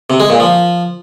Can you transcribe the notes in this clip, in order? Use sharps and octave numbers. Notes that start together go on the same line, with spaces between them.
C3
G#3
A#2
F3